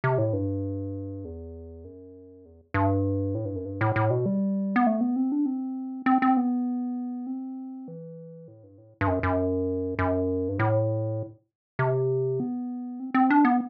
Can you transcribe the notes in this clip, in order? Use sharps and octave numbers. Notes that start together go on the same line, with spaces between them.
C3
A2
G2
E2
F#2
E2
G2
A2
G2
F#2
G2
A2
A2
B2
G3
B3
A3
B3
C4
D4
C4
C4
C4
B3
C4
E3
A2
G2
A2
G2
F#2
F#2
F#2
G2
A2
C3
B3
C4
C4
D4
B3